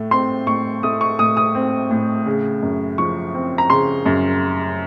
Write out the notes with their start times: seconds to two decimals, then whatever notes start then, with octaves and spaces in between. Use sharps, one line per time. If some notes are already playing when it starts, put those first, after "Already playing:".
Already playing: A2 A3
0.11 C4 C6
0.47 A2 C#6
0.83 A3 D#6
1.01 C#6
1.19 A2 D#6
1.37 D#6
1.55 C4
1.91 A2
2.26 C#3
2.62 F#2
2.98 F3 C#6
3.34 C4
3.58 A#5
3.70 C#3 C6
4.06 F#2